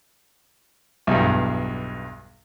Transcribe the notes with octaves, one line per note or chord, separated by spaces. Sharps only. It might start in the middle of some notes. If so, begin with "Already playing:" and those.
B1 E2 G2